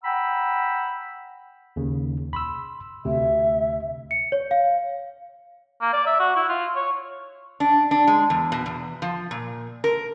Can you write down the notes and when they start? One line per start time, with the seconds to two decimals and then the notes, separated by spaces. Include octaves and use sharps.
0.03 F#5 G5 A#5 B5 E6
1.76 D#2 C#3
2.33 B5 C6 E6
3.05 D2 C3 E5
4.11 C#7
4.32 C#5
4.51 F5
5.81 A#3
5.93 D5
6.06 E5
6.19 F#4
6.36 E4
6.49 F4
6.76 C#5
7.60 D4
7.91 D4
8.07 G#3
8.30 E2
8.52 B2
8.66 E2
9.02 F3
9.31 A#2
9.84 A#4